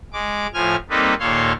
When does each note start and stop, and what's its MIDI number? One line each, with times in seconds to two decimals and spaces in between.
0.13 0.47 56
0.13 0.47 86
0.54 0.76 45
0.54 0.76 53
0.54 0.76 80
0.54 0.76 89
0.90 1.14 55
0.90 1.14 58
0.90 1.14 60
0.90 1.14 63
0.90 1.14 69
0.90 1.14 71
1.19 1.52 39
1.19 1.52 46
1.19 1.52 69
1.19 1.52 73
1.19 1.52 77
1.19 1.52 84